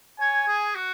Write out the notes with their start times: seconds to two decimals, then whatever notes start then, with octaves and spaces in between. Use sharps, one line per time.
0.20 C#5 G#5
0.48 G#4
0.75 F#4